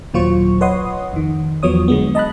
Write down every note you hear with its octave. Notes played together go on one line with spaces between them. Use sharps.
D#2 A#2 F#3 F4 C5 C#6
B4 C#5 D#5 F#5 C6 D#6
F2 D#3
E2 F3 F#3 B3 C#5 D#6
D3 G#3 B3
D#5 A5 B5 F#6